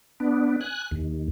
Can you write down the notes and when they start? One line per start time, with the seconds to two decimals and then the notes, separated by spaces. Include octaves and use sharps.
0.20 B3 D4
0.61 G#5 F#6
0.91 D#2